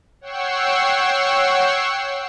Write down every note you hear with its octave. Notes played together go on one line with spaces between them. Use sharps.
C#5 F#5 G5 C#6 E6 C7